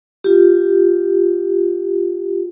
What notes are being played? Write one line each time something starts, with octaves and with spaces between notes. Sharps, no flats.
F4 G4